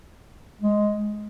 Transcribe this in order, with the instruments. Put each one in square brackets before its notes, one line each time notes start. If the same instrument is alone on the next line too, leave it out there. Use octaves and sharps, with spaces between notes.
[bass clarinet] G#3